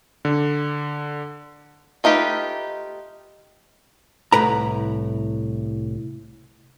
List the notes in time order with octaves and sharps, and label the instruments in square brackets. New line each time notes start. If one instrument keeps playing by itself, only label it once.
[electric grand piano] D3
[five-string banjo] A3 D#4 F4 G4 B4
[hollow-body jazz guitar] C2 A2 B4 A#5